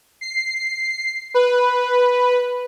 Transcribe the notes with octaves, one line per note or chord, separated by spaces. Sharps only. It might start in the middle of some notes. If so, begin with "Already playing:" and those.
C7
B4